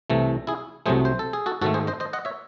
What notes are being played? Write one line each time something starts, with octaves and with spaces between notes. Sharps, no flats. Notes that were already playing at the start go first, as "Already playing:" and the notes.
C2 C3 E3 A3
E4 G#4
C2 C3 F#3 A3 G#4 C5
C5
A4
G#4
F#4 A4
G#2 D#3 A3 F#4 A4
G#4 C5
C5 D#5
C5 D#5
D#5 F#5
C#5 E5